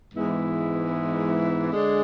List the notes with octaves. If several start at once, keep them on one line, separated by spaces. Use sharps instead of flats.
G#2 E3 G#3 B3 E4
D3 G#3 D4 G#4